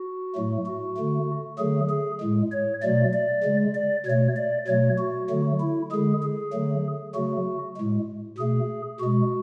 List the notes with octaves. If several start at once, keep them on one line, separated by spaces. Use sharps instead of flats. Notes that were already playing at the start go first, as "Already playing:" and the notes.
Already playing: F#4
A2 F#3 A3
F#4
D3 A3
D3 F#3 A3 G#4
G#4
A2 G#3
C#5
B2 F#3 A3 D5
D5
C#3 G#3
D5
B2 A3 C#5
D5
B2 F#3 A3 C#5
F#4
D3 F#3 A3
E4
D3 G#3 G#4
G#4
D3 F#3 A3
C#3 F#3 A3 F#4
A2 G#3
B2 A3 G#4
B2 G#3 F#4